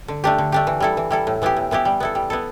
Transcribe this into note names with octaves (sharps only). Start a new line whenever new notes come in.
D3
A3 D4 G4
D3
A3 D4 G4
E3
G3 E4 A4
E3
G3 E4 A4
A2
E3 B3 E4 G4
A2
E3 B3 E4 G4
G3
B3 E4 A4
G3
B3 E4 A4